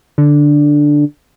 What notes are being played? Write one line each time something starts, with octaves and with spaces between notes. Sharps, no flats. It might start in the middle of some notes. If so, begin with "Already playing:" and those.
D3